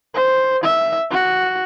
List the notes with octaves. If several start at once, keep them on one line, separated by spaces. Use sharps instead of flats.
C5
E5
F#4